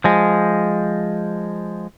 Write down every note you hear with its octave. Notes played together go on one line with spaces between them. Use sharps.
F3 G#3